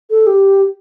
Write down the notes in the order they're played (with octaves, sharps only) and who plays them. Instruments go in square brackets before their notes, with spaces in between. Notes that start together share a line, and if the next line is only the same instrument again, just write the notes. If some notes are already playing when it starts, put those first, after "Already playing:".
[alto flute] A4
G4